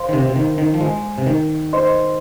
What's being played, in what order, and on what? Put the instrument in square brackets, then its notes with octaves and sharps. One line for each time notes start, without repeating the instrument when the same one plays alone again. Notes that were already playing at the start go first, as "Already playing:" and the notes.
Already playing: [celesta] C5 F5 C6
[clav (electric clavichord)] D#3
C3
C3
D#3
D#3
F3
G#3
C3
D#3
[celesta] C5 D#5 C6